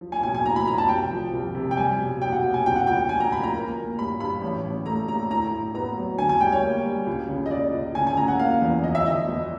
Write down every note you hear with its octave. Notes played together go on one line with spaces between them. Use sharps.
F3
G#5
B1 G#5
G#5
A2 A#5
B5
F3 A#5
A5
C2 G5
F3
C2
C3
G5
G3 G#5
B1
B1 G5
F#5
B1
G#5
C#2 G5
F#5
C#2 G5
F3 G#5
A#5
C#2 B5
A#5
A#3
A#3
G2 B5
G2 B5
A1
A1
A3 A#5
A3 A#5
A2 A#5
A2
B3 A#5
F#3
D3 G#5
G#5
G3 G5
C#5
A#3
G3
C#2
C#3
D#5
C#2 D5
C#2
C#3 G#5
G#5
C#3 A#5
F#5
A#3 F5
E2
F3 D#5
E5
D3 D#5
G1